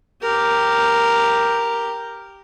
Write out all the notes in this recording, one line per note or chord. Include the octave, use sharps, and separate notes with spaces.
G4 A#4